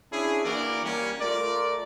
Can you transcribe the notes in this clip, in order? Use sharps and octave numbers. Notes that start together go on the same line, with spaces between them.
C#4 D4 E4 G#4
E3 A#3 D4 F#4 A#4 D5
G3 A#3 C#4
A3 F4 A#4 D5